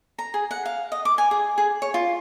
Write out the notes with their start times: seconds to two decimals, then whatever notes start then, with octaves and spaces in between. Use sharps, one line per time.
0.18 A#5
0.34 G#4
0.51 F#5
0.66 F5
0.92 D#5
1.05 D6
1.18 G#5
1.31 G#4
1.58 G#4
1.82 C#5
1.94 F4